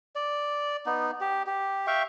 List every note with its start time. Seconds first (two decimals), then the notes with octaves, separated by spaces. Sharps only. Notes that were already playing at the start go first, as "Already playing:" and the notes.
0.16 D5
0.86 B3 D#4
1.21 G4
1.47 G4
1.87 E5 F5 G5 C#6